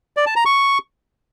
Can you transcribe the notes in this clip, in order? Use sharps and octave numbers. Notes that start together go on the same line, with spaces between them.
D5
A5
A#5
C#6